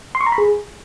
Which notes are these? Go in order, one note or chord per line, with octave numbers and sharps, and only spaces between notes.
C6
C#6
A#5
B5
G#4